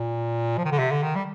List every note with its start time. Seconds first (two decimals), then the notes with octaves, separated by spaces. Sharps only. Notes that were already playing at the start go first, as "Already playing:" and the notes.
Already playing: A#2
0.58 F3
0.65 D#3
0.72 D3
0.79 C3
0.91 D3
1.03 D#3
1.15 G3